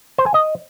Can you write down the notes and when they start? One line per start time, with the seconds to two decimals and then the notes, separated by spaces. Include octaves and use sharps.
0.18 C5
0.26 G#5
0.34 D#5